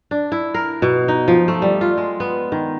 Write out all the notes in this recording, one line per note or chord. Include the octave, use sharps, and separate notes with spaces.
D4
E4
A#4
B2
D#4
F3
A3
G3
F4
G#3
B3
D#3